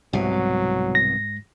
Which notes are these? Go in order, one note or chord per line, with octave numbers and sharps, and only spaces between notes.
C2 G#2 B2 F#3
A#6